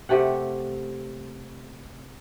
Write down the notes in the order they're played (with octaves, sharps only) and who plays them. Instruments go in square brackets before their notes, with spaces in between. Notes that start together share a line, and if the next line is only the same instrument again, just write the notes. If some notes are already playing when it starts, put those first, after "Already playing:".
[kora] C3 A3 G4 F#5